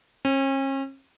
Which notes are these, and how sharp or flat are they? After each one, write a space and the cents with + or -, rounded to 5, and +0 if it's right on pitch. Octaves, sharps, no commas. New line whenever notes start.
C#4 -40